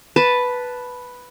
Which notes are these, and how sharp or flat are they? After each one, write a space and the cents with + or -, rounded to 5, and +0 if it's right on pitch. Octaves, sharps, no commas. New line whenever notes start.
B4 +0 A5 +0